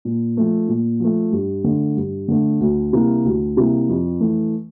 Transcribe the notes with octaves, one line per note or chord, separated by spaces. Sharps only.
A#2
F3 A3
A#2
F3 A3
G2
D3 A3
G2
D3 A3
D2
C3 G3 A#3 E4
D2
C3 G3 A#3 E4
F2
E3 A3